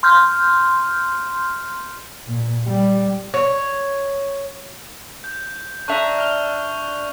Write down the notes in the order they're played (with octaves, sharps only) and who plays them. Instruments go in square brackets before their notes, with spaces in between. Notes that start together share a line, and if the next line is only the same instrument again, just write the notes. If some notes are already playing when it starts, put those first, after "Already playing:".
[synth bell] C6 F6 G6
[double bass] A#2
G3
[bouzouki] C#5
[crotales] G6
[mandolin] D4 E5 A#5 [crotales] C#6 F7
[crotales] F6 F7 G7